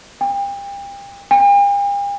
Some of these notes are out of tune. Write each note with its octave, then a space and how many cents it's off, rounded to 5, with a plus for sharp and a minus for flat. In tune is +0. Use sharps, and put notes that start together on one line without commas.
G5 +35
G5 +45